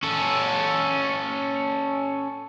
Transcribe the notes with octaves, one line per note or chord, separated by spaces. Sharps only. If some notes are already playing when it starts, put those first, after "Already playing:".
C#4 A4